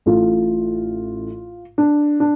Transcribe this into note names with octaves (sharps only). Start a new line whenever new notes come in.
A1 A2 A3 F4
D4
D4